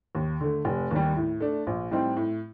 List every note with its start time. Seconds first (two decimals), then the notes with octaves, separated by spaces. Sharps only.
0.15 D#2
0.41 D3 A3
0.65 F1
0.91 D#2 D#3 G3
1.16 A2
1.40 A3 D4
1.67 A#1
1.91 A2 G3 C4 D#4
2.17 A2